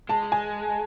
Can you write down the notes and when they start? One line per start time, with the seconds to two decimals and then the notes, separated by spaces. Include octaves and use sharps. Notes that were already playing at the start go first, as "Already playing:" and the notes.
0.09 G#3 A5
0.32 G#5